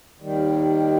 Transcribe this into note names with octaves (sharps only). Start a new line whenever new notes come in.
D#2 D#3 G3